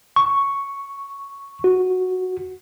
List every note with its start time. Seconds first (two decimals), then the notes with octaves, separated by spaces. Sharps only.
0.16 C#6
1.64 F#4